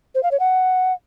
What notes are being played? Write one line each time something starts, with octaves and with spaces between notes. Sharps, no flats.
C5
F5
C#5
F#5